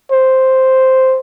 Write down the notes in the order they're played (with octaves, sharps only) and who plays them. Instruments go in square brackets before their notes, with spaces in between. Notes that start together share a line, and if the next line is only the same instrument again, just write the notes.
[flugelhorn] C5